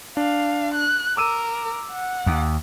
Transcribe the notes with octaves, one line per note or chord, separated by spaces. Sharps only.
D4 F5
F#6
A#4 D6 E6 D#7
F#5
D#2